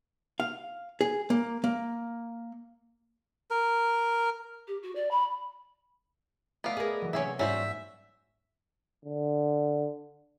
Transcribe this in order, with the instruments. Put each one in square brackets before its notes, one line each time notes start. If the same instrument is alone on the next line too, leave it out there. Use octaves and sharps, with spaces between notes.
[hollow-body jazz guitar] F5
G#4
A#3
A#3
[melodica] A#4
[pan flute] G4
F#4
D5
B5
[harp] A3 D5 D#5 [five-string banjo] B3 F5
[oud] G#4 A#4
[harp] E3 F#3
[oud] C3 C#5 [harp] A#3 D7 [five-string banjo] C#4 G#4 E5
[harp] G#2 E7 [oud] G3 [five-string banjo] C#4 F#4 C5 [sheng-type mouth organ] E5
[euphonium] D3